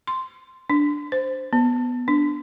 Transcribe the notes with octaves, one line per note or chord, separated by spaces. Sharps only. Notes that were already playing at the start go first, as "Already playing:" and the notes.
C6
D4
C5
B3
D4